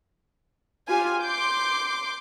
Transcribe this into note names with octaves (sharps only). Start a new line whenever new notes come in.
F4 G4 G#5
C6 D6 G6